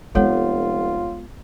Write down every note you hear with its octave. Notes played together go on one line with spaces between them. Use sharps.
F1 G#3 B3 F4 A4 C#5 F#5